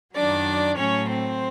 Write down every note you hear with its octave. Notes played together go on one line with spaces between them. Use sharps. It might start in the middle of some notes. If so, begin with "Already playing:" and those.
F#2 D#3 F#3 D4 D5
A2 F#3 A3 C#4 C#5
C4 C5